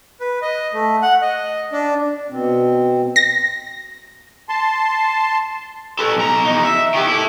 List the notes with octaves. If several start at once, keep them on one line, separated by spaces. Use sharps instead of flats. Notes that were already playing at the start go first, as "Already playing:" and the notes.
B4
D#5
A3
F#5
D#5
D4
B2 C4
A#6
A5 C6
A4 B4
B1 A#5
E2 D#4
E5
D#3 G4
E4 A4